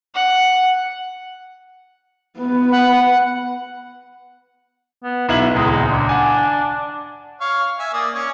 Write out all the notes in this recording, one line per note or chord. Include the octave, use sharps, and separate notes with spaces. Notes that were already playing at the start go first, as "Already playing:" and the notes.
F#5
B3 B4
F#5
B3
B1 B3 E4 F#7
D#1 C#2 G#3
D4
F#5 G#5
C#5 F5 C#6
E5 G#5
A#3 D5 D#6
C#4 C#5